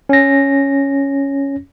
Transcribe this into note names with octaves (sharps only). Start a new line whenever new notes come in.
C#4 A#6